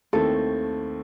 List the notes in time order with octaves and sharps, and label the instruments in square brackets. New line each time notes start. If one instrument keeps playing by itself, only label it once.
[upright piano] D#2 D#3 A3 C4 E4 [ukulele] A4